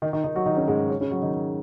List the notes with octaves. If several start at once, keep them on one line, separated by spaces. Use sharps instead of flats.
D#3 D#4
D#3 D#4
D#3 D#4
F#3 F#4
D#3 D#4
C#3 C#4
G#2 G#3
C#3 C#4
C#3 C#4
F#3 F#4
D#3 D#4